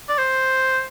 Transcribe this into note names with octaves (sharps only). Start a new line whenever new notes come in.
D5
C5